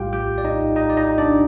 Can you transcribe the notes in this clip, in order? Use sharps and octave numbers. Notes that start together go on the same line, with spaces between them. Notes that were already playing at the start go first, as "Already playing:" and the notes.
Already playing: A#1 A2 G3 F4 G4 F5 G5
G4 G5
D5
D#4 D#5
D#4 D#5
D5
D#4 D#5
D4 D5